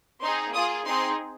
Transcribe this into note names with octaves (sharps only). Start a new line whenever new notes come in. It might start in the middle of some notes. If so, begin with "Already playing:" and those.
C4 D#4 G#4 C6
A#3 F4 G#4 D#6
C4 D#4 G#4 C6